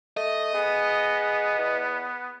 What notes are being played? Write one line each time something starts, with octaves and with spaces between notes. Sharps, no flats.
A3 D#5
B3 G#4
E2